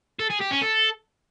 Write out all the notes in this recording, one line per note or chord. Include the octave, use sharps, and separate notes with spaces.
A4
G#4
G4
C#4
A4